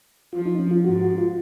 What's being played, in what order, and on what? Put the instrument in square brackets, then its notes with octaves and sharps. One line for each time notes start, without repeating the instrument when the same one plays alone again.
[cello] F3 [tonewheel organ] F4
[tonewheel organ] D#4
C#4
F4
[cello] G#2 [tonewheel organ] F#4
[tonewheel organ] F#4
F4